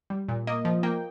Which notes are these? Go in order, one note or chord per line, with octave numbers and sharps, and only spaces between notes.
G3
A#2
A#3 D#5
F3
A#3 G5